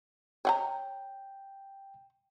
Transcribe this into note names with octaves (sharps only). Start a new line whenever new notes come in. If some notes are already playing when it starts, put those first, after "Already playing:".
C#5 F#5 G5 A#5